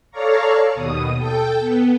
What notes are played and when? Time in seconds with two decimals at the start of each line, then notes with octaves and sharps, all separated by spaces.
0.11 A4 C#5 D5 F5 A#5 C#6
0.74 D#2 B2 D#6
1.17 A4 G5 G6
1.59 B3